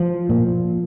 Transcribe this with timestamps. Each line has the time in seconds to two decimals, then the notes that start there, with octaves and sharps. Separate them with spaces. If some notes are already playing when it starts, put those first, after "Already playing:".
Already playing: F3
0.29 A#2